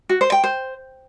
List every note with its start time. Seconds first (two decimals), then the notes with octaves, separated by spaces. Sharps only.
0.09 F#4
0.21 C5
0.32 G5
0.44 C5